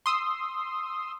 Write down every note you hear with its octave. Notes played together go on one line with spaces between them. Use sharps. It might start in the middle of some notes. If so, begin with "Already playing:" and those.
C6 D#6 E6